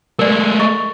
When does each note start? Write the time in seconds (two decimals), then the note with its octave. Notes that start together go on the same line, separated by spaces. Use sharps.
0.19 G#3 A3 A#4 D5
0.60 D#5 C#6